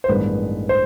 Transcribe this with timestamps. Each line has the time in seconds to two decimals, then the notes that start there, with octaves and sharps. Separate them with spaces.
0.04 C5
0.09 A1 G2 D#3 G#3 B3 B4
0.69 C5